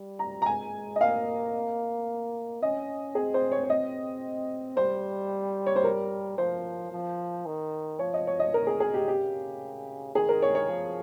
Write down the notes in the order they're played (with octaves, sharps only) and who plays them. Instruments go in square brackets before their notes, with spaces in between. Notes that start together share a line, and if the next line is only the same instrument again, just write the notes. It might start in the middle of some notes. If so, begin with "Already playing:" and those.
Already playing: [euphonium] G3
[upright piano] A#5
A#5
[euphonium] G#3 [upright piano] G#5
[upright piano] D#5
[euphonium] A#3 [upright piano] F5
[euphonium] C#4 [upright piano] D#5
[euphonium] C4 [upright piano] G#4
[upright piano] C5
C#5
C#5
D#5
[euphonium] G3 [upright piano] C5
[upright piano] C#5
C5
A#4
[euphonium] F3 [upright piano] C5
[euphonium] F3
D#3
[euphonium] F3 [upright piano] C#5
[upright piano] D#5
C#5
D#5
[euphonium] D#3 [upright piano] A#4
[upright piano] G#4
G#4
G4
[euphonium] C#3 [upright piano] G4
[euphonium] D#3 [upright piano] G#4
[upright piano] A#4
C#5
C#5
[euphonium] F3